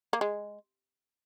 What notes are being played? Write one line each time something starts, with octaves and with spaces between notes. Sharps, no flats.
A#3
G#3